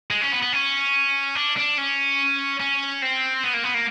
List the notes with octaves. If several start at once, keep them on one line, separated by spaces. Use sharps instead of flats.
G#3
C#4
B3
B3
C#4
D4
D4
C#4
C#4
C4
B3
A#3
B3
A#3